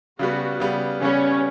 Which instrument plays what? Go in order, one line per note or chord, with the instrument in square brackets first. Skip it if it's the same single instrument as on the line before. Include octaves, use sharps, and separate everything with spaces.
[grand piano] C#3 G3 B3 [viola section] F#4
[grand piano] C#3 G3 B3
[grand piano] C#3 G3 B3 [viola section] C#4